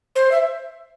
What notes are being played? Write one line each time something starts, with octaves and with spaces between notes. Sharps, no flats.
C5
E5